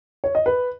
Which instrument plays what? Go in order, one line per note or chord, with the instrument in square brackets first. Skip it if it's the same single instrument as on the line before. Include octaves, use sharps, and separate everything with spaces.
[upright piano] C#5
D#5
B4